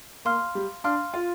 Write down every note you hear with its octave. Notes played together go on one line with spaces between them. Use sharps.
A#3 F5 C6 F6
G3
D4 F5 C6 F6
F4